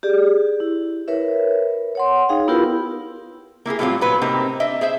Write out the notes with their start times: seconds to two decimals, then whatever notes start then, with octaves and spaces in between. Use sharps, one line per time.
0.03 G4 G#4 D5
0.60 E4
1.08 A#4 B4 C#5 E5
1.95 C#5 F#5 C6
2.29 D#4 G#4 F5 G5
2.48 B3 E4 F4 G4 A#4 B4
3.66 A#3 E4 G4 G#4
3.79 A2 F#3 G3 A3 C4 F4
4.01 A#2 F#3 B4
4.21 A2 C3 A#3 C4 D#4 G4
4.60 D4 D#5 E5
4.81 G#4 C5 E5